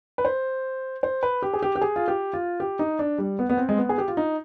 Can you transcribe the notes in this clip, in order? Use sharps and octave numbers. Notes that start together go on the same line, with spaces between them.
B4
C5
C5
B4
G4
G#4
G4
G4
G#4
F4
G4
F4
G4
D#4
D4
G3
B3
B3
C4
G#3
B3
G#4
G4
F4
D#4